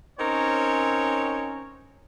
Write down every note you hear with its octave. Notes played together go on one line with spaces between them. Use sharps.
C4 C#4 D#4 A#4 C#5